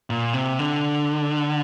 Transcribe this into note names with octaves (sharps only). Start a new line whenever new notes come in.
A#2
C3
D3